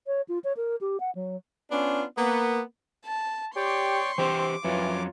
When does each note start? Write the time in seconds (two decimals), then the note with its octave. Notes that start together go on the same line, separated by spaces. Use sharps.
0.07 C#5
0.28 F4
0.44 C#5
0.57 A#4
0.81 G4
1.00 F#5
1.15 F#3
1.71 B3 C#4 D4 F4
2.18 A#3 B3
3.06 A5
3.56 G4 C#5 D5 G5 C6 C#6
4.18 E3 C4 G4 C5 D6
4.64 F2 E3 F#3 F4 C#5